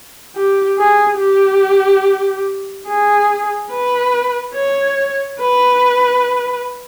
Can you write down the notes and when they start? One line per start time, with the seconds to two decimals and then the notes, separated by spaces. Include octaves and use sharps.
0.36 G4
0.78 G#4
1.19 G4
2.87 G#4
3.71 B4
4.55 C#5
5.39 B4